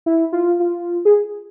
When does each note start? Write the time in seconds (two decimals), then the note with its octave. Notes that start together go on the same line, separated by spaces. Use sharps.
0.06 E4
0.33 F4
0.60 F4
1.05 G#4